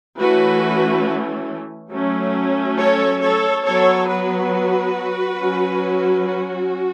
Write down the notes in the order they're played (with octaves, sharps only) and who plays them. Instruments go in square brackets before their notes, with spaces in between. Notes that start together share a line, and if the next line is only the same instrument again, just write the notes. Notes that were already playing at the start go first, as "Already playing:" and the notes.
[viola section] E3 A3 C#4 F#4 B4
F#3 A3 C#4
A4 C#5
A4 C#5
F#3 B3 A4 C#5
F#4 B4
F#3 C#4
F#4